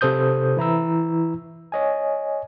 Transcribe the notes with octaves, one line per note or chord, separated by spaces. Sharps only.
C3 A4 C5 D#6 G6
E3 E4 A#5 E6
C#5 D#5 G#5